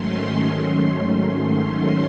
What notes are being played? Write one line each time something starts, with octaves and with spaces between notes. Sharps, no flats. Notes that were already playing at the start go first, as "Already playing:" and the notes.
Already playing: G#2 D#3 F#3 A3 C#4 C6